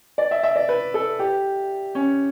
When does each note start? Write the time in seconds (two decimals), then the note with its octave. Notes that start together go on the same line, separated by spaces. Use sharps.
0.18 D5
0.31 E5
0.43 E5
0.56 D5
0.69 B4
0.94 A4
1.19 G4
1.95 C#4